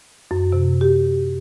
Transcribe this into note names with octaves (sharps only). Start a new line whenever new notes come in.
F#2
C3
G4